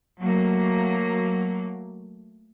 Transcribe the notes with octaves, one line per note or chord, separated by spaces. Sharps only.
F#3 A3 A#3